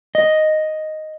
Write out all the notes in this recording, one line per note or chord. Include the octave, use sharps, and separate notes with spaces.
D#5